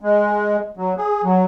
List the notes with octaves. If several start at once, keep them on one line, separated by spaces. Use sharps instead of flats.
G#3
F#3
G#4
F#3